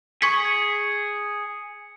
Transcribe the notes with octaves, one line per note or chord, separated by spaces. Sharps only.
G#4 C#6 G#6 B6 C#7